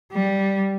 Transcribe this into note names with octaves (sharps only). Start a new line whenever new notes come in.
G3